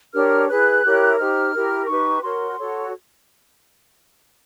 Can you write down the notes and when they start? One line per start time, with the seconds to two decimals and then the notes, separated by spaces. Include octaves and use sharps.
0.13 D4 G4 A#4 C#5 F6
0.48 E4 G#4 B4 F#6
0.83 E4 G4 A#4 C#5
1.18 D#4 G4 C5 F6
1.52 E4 G4 A#4
1.87 D#4 G4 B4 C#6
2.21 F#4 A#4 C#5 C6
2.57 F#4 A4 C#5